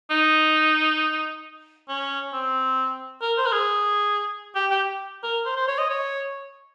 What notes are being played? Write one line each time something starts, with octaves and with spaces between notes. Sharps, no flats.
D#4
C#4
C4
A#4
C5
A#4
G#4
G4
G4
A#4
C5
C5
C#5
D#5
C#5